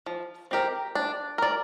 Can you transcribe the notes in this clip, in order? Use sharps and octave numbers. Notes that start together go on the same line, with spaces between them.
F3
C4 G4 A#4
D4
A#4 D5